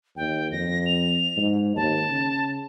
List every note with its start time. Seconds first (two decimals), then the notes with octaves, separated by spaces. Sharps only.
0.17 D#2 G5
0.52 F2 A#6
0.86 F7
1.37 G#2
1.76 D#2 A5
2.09 C#3